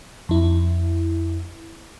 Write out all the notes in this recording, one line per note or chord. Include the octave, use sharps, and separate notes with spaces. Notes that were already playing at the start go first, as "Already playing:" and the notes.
F2 E4